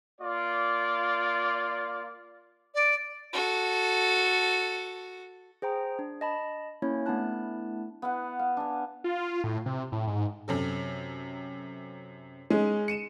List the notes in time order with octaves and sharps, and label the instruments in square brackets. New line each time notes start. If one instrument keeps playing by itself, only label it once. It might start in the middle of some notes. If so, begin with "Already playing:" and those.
[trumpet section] A#3 F4 D5
[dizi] D5
[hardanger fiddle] F#4 A4
[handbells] G#4 C5 G5 A#5
D4
D#5 A5 B5
A#3 C#4 E4 C#5
A3 B3 D4 E4 A5 F#6
[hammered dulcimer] B3 E4 F#5
F5
D4 G#5
[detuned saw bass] F4
A2
C3
A2
G#2
[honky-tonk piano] F#2 C3 A4
[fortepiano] G#3 [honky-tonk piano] C#4 D#4
[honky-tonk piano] C#7 D#7 E7